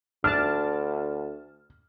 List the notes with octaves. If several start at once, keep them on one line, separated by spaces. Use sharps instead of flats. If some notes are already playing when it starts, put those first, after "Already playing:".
D2 D4 A5 F6